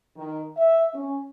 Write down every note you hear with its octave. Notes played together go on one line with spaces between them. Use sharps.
D#3
E5
C#4